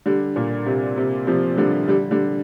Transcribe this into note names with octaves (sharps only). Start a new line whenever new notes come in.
D3 G3
A#2
C3
C3
C3 F3
D3 G3
D3 G3
D3 G3